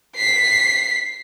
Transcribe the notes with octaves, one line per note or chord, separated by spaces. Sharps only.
B6 C7